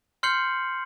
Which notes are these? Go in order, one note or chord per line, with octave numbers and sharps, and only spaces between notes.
C6 F6 G6 C7 C#7 F#7